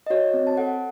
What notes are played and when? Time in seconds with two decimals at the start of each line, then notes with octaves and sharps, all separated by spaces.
0.06 D#5
0.10 F#4 C#5
0.34 C4
0.47 A5
0.57 A4 F#5